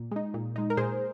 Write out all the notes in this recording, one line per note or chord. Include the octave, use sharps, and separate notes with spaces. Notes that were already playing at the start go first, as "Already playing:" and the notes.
Already playing: A#2
G#3 D#4
A#2
G#3 D#4
A#4
A#2 G#4 C5